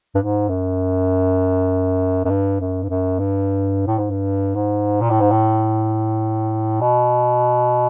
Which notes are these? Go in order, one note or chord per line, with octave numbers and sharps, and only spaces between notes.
G2
G#2
F#2
F#2
G2
F#2
G2
F#2
G2
A2
G#2
G2
G#2
A#2
A2
G#2
A2
B2